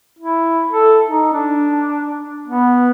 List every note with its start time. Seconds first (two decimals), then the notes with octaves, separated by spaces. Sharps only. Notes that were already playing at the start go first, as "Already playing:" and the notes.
0.19 E4
0.71 A4
1.07 D#4
1.33 D4
2.48 B3